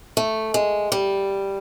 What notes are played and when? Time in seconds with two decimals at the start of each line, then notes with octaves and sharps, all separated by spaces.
0.17 A3
0.54 G#3
0.92 G3